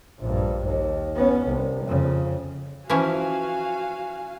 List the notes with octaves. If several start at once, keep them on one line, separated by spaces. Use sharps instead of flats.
A#1 G2
D#2
B3 C#4
C2
F2 C#3
E3 F3 C#4 F#4 F5 G#5